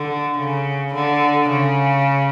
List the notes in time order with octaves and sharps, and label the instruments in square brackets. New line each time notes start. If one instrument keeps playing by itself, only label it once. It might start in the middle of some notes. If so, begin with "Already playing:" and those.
Already playing: [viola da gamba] D3
C#3
D3
C#3